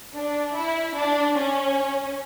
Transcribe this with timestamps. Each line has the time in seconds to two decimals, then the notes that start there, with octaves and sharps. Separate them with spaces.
0.14 D4
0.55 E4
0.96 D4
1.37 C#4